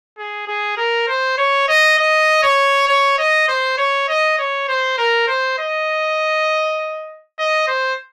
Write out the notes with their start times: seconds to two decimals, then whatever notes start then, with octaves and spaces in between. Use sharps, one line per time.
0.18 G#4
0.47 G#4
0.77 A#4
1.08 C5
1.38 C#5
1.68 D#5
1.98 D#5
2.43 C#5
2.87 C#5
3.18 D#5
3.48 C5
3.77 C#5
4.08 D#5
4.38 C#5
4.68 C5
4.98 A#4
5.27 C5
5.59 D#5
7.39 D#5
7.68 C5